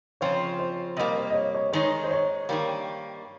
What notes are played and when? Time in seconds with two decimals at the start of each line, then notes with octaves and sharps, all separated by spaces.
0.21 C#3 F3 C4 F4 C#5
0.59 C5
0.97 C3 G3 A#3 D#5
1.16 C5
1.30 D#5
1.34 C#5
1.54 C#5
1.73 D#3 G#3 D#4 C#5
2.04 C5
2.11 C#5
2.49 G2 D#3 G3 A#3